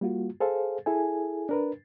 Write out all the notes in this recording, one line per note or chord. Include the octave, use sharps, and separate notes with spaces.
G3 A#3 F4 F#4
G#4 A4 C5 F5
E4 G#4 A4 G#5
D4 A#4 B4